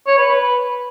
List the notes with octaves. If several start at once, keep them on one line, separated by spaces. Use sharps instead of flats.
C#5
B4
B4